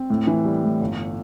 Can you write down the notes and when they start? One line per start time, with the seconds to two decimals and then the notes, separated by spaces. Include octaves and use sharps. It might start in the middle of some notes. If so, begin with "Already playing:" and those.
Already playing: C4
0.10 A2
0.27 E3
0.45 G3
0.63 A2
0.81 G1